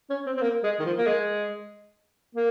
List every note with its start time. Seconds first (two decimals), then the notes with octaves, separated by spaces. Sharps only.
0.10 C#4
0.26 C4
0.37 C4
0.42 A#3
0.63 G#3
0.79 D#3
0.85 F3
0.98 A#3
1.06 G#3
2.35 A#3